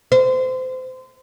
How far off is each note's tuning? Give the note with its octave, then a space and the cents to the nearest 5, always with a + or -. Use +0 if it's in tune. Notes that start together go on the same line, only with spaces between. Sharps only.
C5 -25